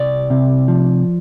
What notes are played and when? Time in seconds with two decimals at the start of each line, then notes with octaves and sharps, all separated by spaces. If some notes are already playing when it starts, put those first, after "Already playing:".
Already playing: C2 D5
0.30 C3
0.68 F3